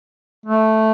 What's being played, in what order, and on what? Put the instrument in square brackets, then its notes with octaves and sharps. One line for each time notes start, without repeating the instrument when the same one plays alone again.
[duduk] A3